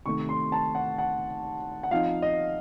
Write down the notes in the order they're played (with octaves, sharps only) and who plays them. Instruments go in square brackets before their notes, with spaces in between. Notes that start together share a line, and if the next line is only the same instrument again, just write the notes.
[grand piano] C3 D#3 A3 C#6
C6
A5
F#5
F#5
F#5
F3 C4 D#4 F5
D#5